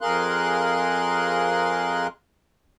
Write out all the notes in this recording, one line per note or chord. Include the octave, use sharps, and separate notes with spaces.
F2 G#4 A#4 F5 C6 F#6